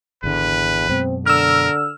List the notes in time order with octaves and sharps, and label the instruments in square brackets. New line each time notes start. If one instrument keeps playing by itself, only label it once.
[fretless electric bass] G#1 D3 [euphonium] E2 [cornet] B4
[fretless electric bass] F#2 B2 G#3 [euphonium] C4
[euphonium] D3 [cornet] A#4 [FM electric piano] E6 F6